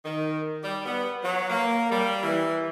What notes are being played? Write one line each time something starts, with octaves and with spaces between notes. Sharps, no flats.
D#3
G3
B3
F#3
A#3
G3
E3